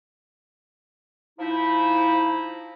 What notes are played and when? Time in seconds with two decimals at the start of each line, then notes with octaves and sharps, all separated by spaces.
1.39 F3 D#4 E4